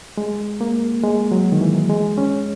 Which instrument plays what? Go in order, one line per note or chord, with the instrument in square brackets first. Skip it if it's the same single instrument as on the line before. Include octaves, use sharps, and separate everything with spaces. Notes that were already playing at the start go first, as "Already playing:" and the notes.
[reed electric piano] G#3
A#3
G#3
F#3
D#3
E3
G#3
C#4